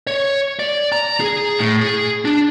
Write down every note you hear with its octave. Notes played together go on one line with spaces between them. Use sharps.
C#5
D5
A#5
G#4
A2
G#4
D4